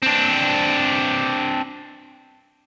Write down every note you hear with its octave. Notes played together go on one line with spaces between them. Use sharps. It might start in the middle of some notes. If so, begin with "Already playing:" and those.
C4 D4